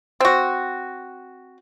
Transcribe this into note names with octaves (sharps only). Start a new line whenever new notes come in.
C4 F#4